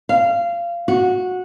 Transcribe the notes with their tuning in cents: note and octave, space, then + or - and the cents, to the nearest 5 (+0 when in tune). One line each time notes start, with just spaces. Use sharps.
F5 -20
F#4 -15